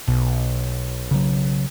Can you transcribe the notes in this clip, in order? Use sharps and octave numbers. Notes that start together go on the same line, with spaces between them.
B1 B2
C#3 F#3